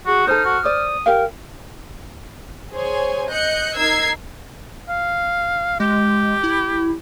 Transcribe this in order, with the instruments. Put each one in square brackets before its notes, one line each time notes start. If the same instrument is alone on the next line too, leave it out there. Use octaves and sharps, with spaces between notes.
[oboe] F#4 [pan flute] G#4
[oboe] D#4 [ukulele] A4 C5 [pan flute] F6
[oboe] F#4
[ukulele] C5 D5 [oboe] D#6
[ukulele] G4 F5 [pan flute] A#4
[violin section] G#4 C5 C#5 G#5
D#5 F#6 G6 C#7
D#4 A#4 E6 G#6 C7
[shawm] F5
[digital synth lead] G#3 [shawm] G4
[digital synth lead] E4